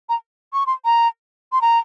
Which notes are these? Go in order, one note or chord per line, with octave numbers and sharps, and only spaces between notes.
A#5
C#6
C6
A#5
C6
A#5